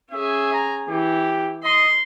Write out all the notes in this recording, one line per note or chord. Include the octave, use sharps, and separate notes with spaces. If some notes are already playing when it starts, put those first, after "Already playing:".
C#4 G#4 E5
A#5
E3 G4
D#5 C6